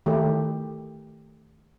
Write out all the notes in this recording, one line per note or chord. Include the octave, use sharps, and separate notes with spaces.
D#3 A3 G4